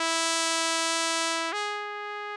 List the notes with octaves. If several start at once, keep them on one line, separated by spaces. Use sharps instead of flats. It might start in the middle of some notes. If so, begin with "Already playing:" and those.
Already playing: E4
G#4